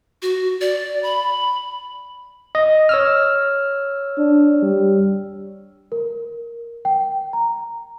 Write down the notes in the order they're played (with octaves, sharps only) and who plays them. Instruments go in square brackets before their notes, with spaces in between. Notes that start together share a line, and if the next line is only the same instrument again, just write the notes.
[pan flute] F#4
D5
B5
[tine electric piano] D#5
C#5 E6 F6
[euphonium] D4
G3
[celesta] A#4
G5
A#5